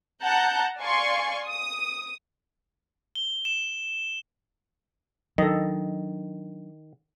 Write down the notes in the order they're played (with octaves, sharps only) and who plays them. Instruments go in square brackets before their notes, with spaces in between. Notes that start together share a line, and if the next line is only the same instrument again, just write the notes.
[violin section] F#5 A5 A#5 F#6 G6
D5 F5 G#5 C6 C#6
D#6
[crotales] G7
E7
[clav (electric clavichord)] D#3 [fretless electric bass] F#3 D4 [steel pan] A4 D#5